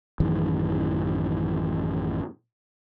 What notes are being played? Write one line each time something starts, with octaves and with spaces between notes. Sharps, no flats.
A1 F#2 D#3 E3